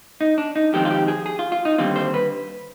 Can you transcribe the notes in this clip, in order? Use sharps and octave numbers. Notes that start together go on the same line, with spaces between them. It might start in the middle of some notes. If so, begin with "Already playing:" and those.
D#4
D4
D#4
F2 D#3 G#3 C4 G4
F4
G4
G#4
G#4
F4
F4
D#4
D#2 D3 G3 C4 F4
C5
B4